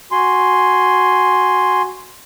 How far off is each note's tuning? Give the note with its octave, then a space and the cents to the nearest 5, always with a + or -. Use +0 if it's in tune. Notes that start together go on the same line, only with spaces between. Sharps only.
F#4 +0 G#5 +0 C6 +0